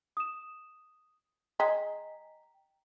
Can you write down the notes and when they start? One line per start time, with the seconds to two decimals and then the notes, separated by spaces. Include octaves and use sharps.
0.17 D#6 E7
1.60 G#3 G5 A#5 B6